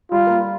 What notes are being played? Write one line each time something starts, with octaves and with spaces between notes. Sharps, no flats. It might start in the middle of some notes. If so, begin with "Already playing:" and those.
G3 F4
A#3